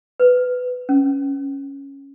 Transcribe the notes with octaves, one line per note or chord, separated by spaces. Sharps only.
B4
C#4